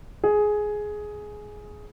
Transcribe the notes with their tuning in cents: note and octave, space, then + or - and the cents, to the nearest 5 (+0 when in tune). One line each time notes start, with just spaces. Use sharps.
G#4 +10